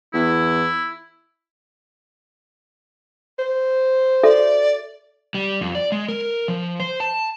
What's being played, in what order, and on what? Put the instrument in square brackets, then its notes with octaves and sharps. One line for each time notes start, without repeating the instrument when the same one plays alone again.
[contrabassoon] E2 [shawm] E4
[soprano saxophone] C5
[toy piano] F#4 A4 E5 [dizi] D5
[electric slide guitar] G3
F2
D5
G#3
A#4
F3
C5
A5